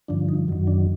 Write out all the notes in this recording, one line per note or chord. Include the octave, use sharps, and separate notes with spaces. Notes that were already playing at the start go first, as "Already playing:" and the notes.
G2 D3 F3 D4
D#4
F#2 D#3 F#3
D4